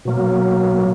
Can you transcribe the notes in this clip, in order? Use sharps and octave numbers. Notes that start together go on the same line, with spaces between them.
B2 F#3 A#3